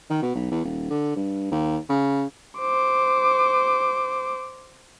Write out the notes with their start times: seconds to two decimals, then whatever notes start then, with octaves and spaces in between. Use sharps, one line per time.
0.10 D#3
0.22 B2
0.35 B1
0.51 E2
0.64 D#1
0.90 D3
1.16 G2
1.51 D#2
1.89 C#3
2.59 C5 D6